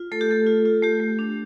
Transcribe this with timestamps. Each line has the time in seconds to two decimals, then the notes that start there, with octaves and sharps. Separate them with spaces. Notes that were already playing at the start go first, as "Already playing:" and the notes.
Already playing: F4
0.12 A3 A4
0.21 G4
0.29 A3 A4
0.47 F4
0.66 F4
0.82 A3 G4
1.00 A3
1.19 D4